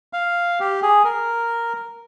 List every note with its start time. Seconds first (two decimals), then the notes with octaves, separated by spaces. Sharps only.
0.13 F5
0.60 G4
0.83 G#4
1.05 A#4